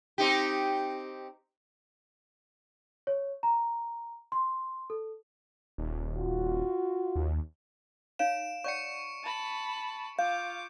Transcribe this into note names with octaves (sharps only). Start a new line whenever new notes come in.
C4 D#4 G4
C#5
A#5
C6
A4
D#1
F4 F#4
D#2
D#4 C#5 F5 D7 E7
C#5 D5 F#5 C#6 C#7
A5 B5
F4 F5 D6 G6